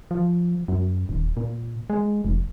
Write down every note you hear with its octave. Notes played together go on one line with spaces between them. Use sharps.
F3
F#2
D#1
A#2
G#3
F1